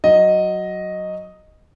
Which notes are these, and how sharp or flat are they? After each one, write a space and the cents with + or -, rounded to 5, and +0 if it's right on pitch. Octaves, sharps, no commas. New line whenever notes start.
F#3 +0 D#5 +0